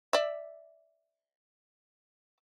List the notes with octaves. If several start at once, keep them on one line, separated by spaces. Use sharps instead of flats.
D5 E5